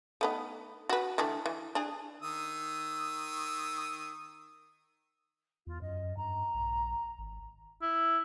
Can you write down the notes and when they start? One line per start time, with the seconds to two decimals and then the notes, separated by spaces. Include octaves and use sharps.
0.21 A3 B3 D#4
0.89 F#4 B4
1.18 D3 E3 A3
1.46 E3
1.75 D4 G#4
2.22 D#3 D#6 E6
5.67 E2 F4
5.81 F#2 D#5
6.17 G2 A#5
6.54 A#1
7.18 G#1
7.82 E4